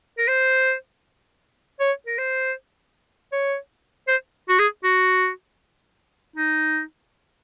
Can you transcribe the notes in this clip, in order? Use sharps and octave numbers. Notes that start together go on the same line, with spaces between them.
A#4
C5
C#5
A#4
C5
C#5
C5
F#4
G#4
F#4
D#4